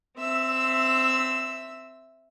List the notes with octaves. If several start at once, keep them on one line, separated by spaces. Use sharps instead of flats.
C4 E5 E6